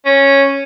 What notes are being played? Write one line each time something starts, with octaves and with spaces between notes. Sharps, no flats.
C#4